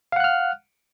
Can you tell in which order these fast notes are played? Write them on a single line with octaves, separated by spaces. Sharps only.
F5 F#5 F#6 F6